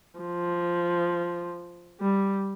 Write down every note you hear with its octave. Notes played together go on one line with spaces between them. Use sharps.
F3
G3